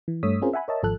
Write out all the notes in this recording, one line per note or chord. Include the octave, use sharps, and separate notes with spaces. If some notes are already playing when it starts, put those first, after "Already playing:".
E3
G2 A3 C#5 D#6 E6 B6
C4 C#4 F4 G#4 A#4 C5
E5 F#5 G#5 B5
A#4 C#5 D#5 E5 A5
G#1 F3 A4 F#6